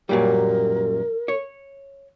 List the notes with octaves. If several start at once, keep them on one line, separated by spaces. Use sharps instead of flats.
F#2 A#2 G3 A#4
C#5